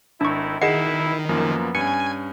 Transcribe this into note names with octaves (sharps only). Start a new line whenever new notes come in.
G#1 D#3 A3 D4 E4 C#6
B2 D#3 E4 G#4 D#5 F#5 C7 E7
F#2 F3 A#3 B3
G2 C#4 G#5 C#7